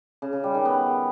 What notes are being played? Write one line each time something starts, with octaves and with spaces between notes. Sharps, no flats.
C#3
C#3
G3
D#3
B3